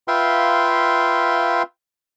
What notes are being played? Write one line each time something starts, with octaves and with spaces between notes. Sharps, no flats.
F4 B4 E5 F5 G5 C6